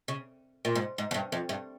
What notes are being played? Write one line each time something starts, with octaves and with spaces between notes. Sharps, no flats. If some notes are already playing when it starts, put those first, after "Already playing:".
C#3
A#2
G#2
G#2
F2
G2
F2
G2